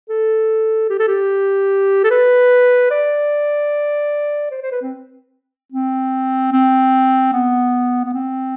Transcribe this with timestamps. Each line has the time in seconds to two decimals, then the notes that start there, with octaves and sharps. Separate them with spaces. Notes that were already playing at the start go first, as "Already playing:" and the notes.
0.09 A4
0.89 G4
0.99 A4
1.07 G4
2.04 A4
2.11 B4
2.91 D5
4.51 C5
4.62 C5
4.72 B4
4.82 C4
5.72 C4
6.52 C4
7.33 B3
8.05 B3
8.14 C4